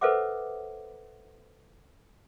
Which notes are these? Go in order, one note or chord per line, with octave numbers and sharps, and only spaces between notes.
A4 B4 C5 E5 F#5 D6